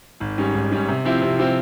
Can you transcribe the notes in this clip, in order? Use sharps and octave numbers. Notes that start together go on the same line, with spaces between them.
G#1
G#2 G3 C#4
G#1
G#2 G3 C#4
C3
F3 C4 E4 G4
C3
F3 C4 E4 G4